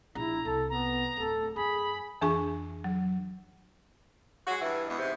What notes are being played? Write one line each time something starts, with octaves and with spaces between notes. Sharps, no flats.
A#1 E4 A#5
C2 A4
B3 A#5
D1 A4
F#2 G#4 B5
F2 E3 D4 G#4 G#5 C#6
F#3
G#3 F#4
G2 E3
E2 B2 G#3
G#2 C3